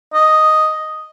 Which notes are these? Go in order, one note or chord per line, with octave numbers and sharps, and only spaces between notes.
D#5